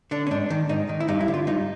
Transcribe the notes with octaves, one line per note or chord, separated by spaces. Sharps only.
D3 D4
C#4
G#2 D4
D#3
G#2 D#4
D#3
E4
G2 D#4
E4
D3
F4
G2 D#4